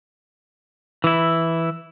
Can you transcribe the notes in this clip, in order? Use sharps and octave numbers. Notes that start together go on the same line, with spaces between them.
E3 E4